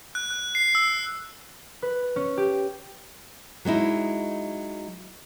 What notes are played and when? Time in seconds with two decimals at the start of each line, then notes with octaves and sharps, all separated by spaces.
0.15 F#6
0.31 F#6
0.55 C7
0.75 E6
1.82 B4
2.16 C#4
2.37 G4
3.65 F#3 G#3 D#4 E4